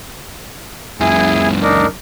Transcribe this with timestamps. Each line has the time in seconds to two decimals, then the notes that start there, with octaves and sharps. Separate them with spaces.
1.01 C#2 F#2 E4 G#4 G#5
1.62 D4 D#4 A#4